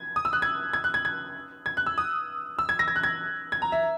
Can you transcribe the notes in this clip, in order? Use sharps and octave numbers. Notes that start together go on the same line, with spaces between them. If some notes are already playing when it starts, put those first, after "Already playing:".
Already playing: G#6
D#6
E6
F#6
G#6
G#6
F#6
G#6
G#6
G#6
F#6
E6
D#6
E6
G#6
A#6
G#6
F#6
G#6
G#6
A#5
E5